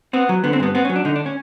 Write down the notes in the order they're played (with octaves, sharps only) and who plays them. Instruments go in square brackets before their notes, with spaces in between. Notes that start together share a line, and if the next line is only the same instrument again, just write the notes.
[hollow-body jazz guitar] B3 C4
F#3
D3 B3
C4
G2 B3
B3 C4
C#4
F#3
D4
D3 D#4
D4
C#4